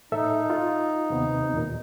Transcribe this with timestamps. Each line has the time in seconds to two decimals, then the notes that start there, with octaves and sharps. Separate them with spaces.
0.12 A2 D#4 A4 E5
0.50 F4
1.10 D#2 C3 B3
1.54 D#2 A#2